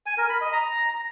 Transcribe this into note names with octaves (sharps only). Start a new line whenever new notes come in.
G#5
A#4
B5
D#5
A#5